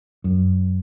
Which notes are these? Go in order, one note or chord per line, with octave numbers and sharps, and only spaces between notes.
F#2